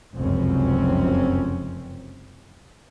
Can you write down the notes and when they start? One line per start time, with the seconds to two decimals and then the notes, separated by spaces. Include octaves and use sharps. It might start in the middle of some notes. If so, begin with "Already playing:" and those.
0.16 F1 C#2 F#2 C3 C4 C#4